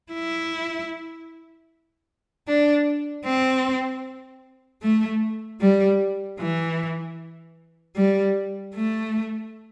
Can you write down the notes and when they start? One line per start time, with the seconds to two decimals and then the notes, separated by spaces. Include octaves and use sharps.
0.12 E4
2.48 D4
3.25 C4
4.82 A3
5.61 G3
6.39 E3
7.96 G3
8.74 A3